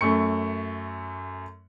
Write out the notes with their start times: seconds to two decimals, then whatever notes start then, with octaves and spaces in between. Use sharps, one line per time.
0.01 F#2 A3 C#6 C#7